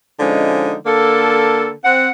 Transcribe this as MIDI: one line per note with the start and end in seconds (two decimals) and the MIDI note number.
0.20 0.75 50
0.20 0.75 53
0.20 0.75 56
0.20 0.75 61
0.20 0.75 63
0.86 1.71 50
0.86 1.71 58
0.86 1.71 69
1.84 2.10 60
1.84 2.10 78